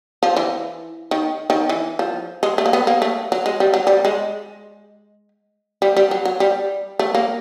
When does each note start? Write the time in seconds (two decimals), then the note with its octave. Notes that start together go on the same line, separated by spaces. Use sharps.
0.23 F3
0.37 E3
1.11 D#3
1.50 D#3
1.69 E3
1.99 F3
2.43 G#3
2.58 A3
2.66 A#3
2.73 B3
2.87 A#3
3.02 A3
3.32 F#3
3.46 G#3
3.60 G3
3.74 F#3
3.87 G3
4.05 G#3
5.82 G3
5.97 G3
6.11 F#3
6.25 F#3
6.40 G3
6.99 A3
7.15 A#3